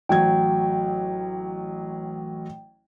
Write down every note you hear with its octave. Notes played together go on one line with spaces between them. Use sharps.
A1 F#3 G5 G#6